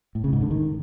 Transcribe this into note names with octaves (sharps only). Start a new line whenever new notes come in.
A2
C#3
G#2
D3
D#3